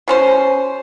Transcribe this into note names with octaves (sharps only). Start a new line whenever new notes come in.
B2 C#4 C5